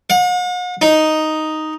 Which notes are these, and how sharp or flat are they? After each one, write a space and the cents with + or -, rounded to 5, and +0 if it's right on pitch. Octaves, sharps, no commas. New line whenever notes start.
F#5 -45
D#4 +0